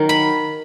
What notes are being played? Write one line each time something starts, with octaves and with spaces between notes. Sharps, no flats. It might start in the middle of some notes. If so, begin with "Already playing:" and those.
Already playing: D#3 F#3
B5